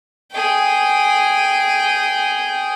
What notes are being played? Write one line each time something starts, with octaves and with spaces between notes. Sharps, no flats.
G#4 G5